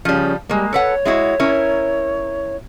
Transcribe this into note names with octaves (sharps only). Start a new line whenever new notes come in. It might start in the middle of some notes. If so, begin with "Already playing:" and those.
C#3 F3 G3
G3 G#3 A#3
A4 B4 C#5 F#5
G#3 E4 F#4
C#4 E4 A#4